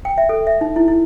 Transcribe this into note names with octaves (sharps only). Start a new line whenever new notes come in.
G5
E5
A4
E5
D#4
E4
E4